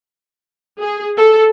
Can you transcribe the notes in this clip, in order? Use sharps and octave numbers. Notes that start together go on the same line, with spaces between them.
G#4
A4